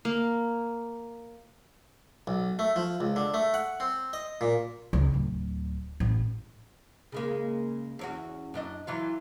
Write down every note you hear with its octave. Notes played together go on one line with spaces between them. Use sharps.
A#3
B1
A3
F3
C#2
D3
A3
F#5
C4
D#5
A#2
C#2
D1
A1
C#3 G#3 A#3
E2 C#4 F#4
F#2 D4 D#5
E3 F#3 F4